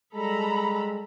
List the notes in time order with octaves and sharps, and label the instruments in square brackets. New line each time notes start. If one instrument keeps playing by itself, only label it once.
[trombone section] G3 G#3 [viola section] A4 A#5 B5